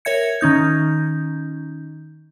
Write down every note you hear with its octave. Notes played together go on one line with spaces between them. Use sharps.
A#4 C#5 E5 G#6 C#7
D#3 C#4 D#4 G6